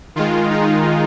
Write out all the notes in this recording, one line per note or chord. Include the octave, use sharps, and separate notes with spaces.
D#3 G#3 F4
D#4